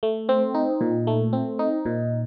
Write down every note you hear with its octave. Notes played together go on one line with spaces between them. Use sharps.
A3
C4
D#4
A#2
A3
C4
D#4
A#2